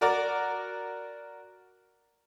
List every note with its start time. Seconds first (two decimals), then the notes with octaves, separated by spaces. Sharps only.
0.01 F#4 A#4 D5